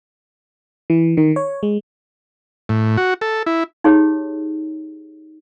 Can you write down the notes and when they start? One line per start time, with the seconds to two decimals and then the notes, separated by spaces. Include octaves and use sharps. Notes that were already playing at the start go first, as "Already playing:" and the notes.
0.90 E3
1.17 D#3
1.36 C#5
1.63 G#3
2.69 A2
2.97 F#4
3.21 A4
3.46 E4
3.84 D#4 G4 G#4 C#5